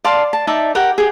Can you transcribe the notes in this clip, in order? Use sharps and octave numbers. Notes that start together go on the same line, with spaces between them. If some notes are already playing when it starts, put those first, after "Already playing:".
D5 F5 A5 C6
A5
D#4 D5 E5 A5
G4 A#4 F#5 G5
G4 G#4